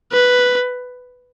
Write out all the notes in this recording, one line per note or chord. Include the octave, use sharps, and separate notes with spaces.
B4